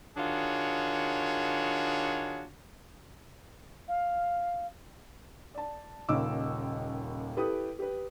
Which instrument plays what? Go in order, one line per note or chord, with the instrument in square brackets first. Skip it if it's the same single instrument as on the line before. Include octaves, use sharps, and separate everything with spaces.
[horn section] D#3 D4 F4 F#4 G#4 C#5
[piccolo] F5
[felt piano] D5 A5
D#1 D#2 C#3 D#5 D6 E6
E4 G4 A4 B4 G5 D#6
G4 B4